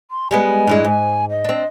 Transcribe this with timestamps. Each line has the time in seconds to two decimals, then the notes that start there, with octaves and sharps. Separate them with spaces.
0.11 C6
0.31 G3 G#3 B3 G#5
0.67 G2 E3 G#3
0.84 G#2 G#5
1.30 D#5
1.45 C4 D4